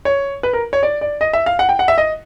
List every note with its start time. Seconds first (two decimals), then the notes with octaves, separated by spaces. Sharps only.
0.05 C#5
0.43 B4
0.53 A#4
0.73 C#5
0.83 D5
1.01 D5
1.21 D#5
1.33 E5
1.46 F5
1.59 F#5
1.69 G5
1.79 F#5
1.88 E5
1.98 D#5